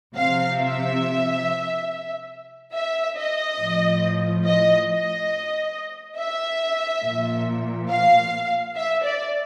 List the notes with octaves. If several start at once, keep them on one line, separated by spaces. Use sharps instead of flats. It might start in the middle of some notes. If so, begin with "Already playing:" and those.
C3 F3 F5
E5
E5
D#5
A2 F3
D#5
D#5
E5
A#2 F3
F5
E5
D5